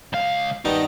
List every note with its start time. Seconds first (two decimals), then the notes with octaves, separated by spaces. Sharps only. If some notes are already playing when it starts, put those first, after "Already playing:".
0.13 C#2 F5
0.65 G2 D#3 B3 D#4